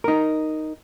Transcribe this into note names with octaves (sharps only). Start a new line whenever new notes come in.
D#4 A#4